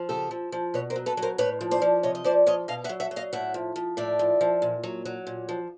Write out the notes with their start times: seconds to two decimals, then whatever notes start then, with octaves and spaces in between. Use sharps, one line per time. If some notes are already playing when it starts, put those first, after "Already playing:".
Already playing: F3
0.09 C#3 G4 A4
0.31 F3
0.52 F3
0.74 B2 B4 C#5
0.90 A#4 C5
0.96 F#3
1.06 A4 B4
1.17 F#3
1.22 A#4 C5
1.38 A2 B4 C#5
1.61 F3
1.71 C5 D5
1.82 F3
2.03 C3 C#5 D#5
2.15 D#5
2.24 F3 C5 D5
2.46 F3 C#5 D#5
2.68 B2 D#5 F5
2.84 E5 F#5
2.89 F#3
3.00 E5 F#5
3.11 F#3
3.16 D#5 F5
3.33 A2 E5 F#5
3.54 F3
3.76 F3
3.97 A2 D5 E5
4.19 F3
4.41 F3
4.62 A#2
4.84 F#3
5.05 F#3
5.27 A#2
5.49 F3